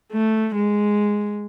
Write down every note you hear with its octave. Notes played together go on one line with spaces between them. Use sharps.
A3
G#3